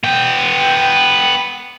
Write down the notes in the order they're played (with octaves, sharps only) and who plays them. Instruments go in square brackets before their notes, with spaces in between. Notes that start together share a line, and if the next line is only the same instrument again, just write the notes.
[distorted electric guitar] B3 G5